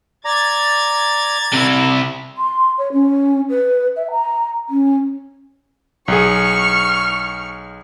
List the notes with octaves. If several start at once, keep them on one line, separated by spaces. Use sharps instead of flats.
D5 A#5 G#6 A6
C3 E4
C6
C#5
C#4
B4
E5
A#5
C#4
B1 G#4 C#6 F6